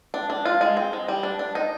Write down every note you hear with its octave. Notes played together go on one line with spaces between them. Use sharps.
D4
D4
F4
G#3
C4
G#3
G3
D4
D4
D#4